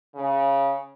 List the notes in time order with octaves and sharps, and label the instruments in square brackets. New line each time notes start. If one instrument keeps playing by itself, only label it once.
[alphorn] C#3